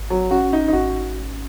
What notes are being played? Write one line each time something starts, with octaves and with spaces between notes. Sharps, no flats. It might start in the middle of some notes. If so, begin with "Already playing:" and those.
Already playing: G#1
F#3
C#4 F#4
D#4
D#4
G#1 F#4